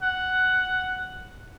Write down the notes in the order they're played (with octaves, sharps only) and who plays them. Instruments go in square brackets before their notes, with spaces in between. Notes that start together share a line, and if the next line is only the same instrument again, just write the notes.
[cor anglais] F#5